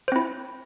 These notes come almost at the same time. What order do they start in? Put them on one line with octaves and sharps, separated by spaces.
C5 C4 E4